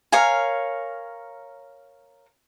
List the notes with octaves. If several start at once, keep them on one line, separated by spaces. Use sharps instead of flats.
A#4 C#5 F5 G#5